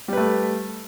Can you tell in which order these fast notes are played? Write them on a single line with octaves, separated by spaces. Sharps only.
G3 B4 A3